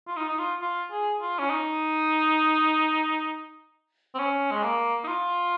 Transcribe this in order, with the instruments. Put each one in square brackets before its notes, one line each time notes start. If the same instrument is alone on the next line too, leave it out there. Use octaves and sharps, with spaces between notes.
[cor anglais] F4
D#4
D#4
F4
F4
G#4
F4
C#4
D#4
C4
C#4
G#3
A#3
D#4
F4